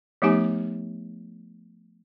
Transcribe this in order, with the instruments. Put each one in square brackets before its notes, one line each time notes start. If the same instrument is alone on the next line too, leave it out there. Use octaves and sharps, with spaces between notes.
[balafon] F3 A3 B3 D#4 G4 G#5